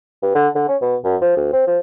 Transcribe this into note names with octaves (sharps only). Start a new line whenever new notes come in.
G2
D3
D3
C#4
B2
F#2
F3
D2
C4
F3